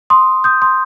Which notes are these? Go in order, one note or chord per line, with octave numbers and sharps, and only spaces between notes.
C6 D#6
D#6 G6
C6 D#6